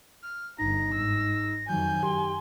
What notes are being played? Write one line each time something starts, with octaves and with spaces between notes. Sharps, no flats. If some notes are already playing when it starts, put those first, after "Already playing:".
F6
G1 D3 D#4 A#5 A#6
G#2 E6
F2 D#3 F#3 G#5 G6
F#2 G4 C6